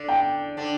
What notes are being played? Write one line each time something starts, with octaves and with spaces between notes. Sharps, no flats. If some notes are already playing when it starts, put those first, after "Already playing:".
Already playing: D3 D4
G5
D3 D4